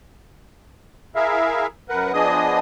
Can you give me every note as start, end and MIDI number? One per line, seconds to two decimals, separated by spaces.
1.15 1.67 64
1.15 1.67 68
1.15 1.67 70
1.15 1.67 76
1.15 1.67 77
1.89 2.12 42
1.89 2.12 70
1.89 2.12 71
1.89 2.12 78
2.14 2.59 53
2.14 2.59 59
2.14 2.59 62
2.14 2.59 68
2.14 2.59 75
2.14 2.59 87